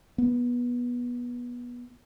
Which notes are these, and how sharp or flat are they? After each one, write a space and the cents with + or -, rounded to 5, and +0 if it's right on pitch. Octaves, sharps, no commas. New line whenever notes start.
B3 -20